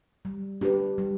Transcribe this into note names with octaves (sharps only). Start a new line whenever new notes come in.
G3
D4 G4 B4
G3